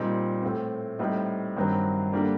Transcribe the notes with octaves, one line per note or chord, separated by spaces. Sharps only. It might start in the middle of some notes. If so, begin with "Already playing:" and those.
Already playing: A#2 G3 C4 D#4
A2 A3 C4
A2 G3 C4 D#4
G2 D#3 F#3 C4
D3 G3 A#3 D4